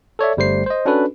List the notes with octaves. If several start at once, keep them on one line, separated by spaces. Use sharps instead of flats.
A4 C#5 D5 E5
G1 G3 A3 C5 C7
C5 D#5
C#4 D4 F#4 A4 B4